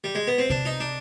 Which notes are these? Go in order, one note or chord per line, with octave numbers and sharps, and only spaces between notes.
G3
G#3
B3
C4
C3 D4
D#4
D4